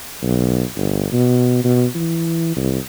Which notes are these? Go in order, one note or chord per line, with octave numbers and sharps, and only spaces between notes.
B1
G1
B2
B2
E3
C2